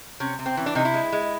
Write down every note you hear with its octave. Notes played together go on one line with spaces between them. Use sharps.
C3 C#4
C3
C4
E3 C#4
D4
C3 D#4
E4
G#3
G#3